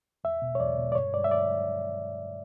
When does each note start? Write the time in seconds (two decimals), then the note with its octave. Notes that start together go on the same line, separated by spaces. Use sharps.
0.24 E2 E5
0.42 B2
0.55 C#5
0.60 E2 D5
0.78 B2
0.92 D5
0.95 G2 C#5
1.13 G2 D5
1.24 E5
1.31 D5